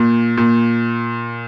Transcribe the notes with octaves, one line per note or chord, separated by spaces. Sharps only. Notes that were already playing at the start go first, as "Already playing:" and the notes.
Already playing: A#2
A#2